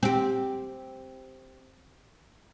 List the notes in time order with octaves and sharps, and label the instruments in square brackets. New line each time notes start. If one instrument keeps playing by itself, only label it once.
[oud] C4 G4